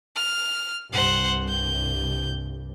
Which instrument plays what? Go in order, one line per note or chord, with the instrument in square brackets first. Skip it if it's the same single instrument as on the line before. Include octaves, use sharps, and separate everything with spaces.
[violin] F6
[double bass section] C2 G2 [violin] C5 F#5
[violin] G6